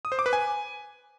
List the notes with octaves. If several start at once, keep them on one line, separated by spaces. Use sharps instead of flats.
D#6
C5
D6
B4
G#5